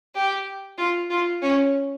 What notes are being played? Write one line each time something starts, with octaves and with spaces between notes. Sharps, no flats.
G4
F4
F4
C#4